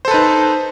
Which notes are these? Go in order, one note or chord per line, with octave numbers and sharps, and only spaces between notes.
D#4 A4 B4 C5